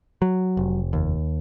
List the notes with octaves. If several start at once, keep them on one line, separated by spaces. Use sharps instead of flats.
F#3
F1
D#2